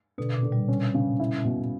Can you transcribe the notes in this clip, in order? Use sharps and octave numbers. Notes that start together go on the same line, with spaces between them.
B2 D3
A#2
D3
G3
C#4
C#3
E4
B2